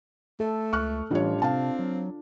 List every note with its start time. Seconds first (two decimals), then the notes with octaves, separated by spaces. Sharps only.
0.40 A3 A4
0.73 C#2 C#6 F6 F#6
1.11 A1 E3 G3 D4 F4 C#5
1.42 C3 C4 F5 A5
1.79 F#3